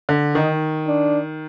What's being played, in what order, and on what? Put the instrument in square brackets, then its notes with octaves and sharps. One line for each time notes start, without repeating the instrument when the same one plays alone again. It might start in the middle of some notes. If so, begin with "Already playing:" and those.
[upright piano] D3
[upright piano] D#3 [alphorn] D#4
[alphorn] D4